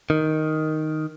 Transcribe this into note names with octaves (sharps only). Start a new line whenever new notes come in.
D#3